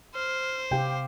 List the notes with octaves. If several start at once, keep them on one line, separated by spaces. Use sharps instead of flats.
C5 F6
C3 G4 F5 G5